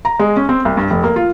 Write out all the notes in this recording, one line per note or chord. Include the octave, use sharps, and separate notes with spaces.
A#5
G#3
C#4
C4
C2
G2
F1
A#3
F4